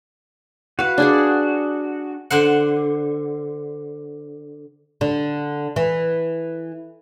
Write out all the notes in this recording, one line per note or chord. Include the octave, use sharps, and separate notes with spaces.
F#4 B4 F5
D4 G#4 D5
D3 C5 F#5
D3
E3